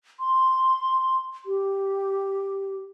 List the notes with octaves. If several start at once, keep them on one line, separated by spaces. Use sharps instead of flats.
C6
G4